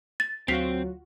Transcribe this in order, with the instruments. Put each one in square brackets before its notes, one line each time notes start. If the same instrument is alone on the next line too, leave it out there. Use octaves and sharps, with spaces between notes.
[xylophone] A6
[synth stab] D2 F4 F#4 [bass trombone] F#3 [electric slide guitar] C4 [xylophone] B6 C7 F7